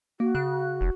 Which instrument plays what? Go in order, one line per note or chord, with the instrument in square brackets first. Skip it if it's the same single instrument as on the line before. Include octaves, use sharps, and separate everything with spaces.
[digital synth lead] A#3 [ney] F#4
[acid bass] C#3 [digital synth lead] F#6
[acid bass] F1